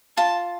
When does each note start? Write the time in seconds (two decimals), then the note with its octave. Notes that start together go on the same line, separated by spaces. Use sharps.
0.17 F4 A5